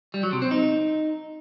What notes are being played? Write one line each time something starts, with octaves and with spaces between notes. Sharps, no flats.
G3
F#3
C3
C4
D#4